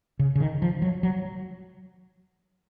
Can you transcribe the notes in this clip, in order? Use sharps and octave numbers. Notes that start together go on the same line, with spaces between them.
C#3
C#3
D#3
F3
F#3
F#3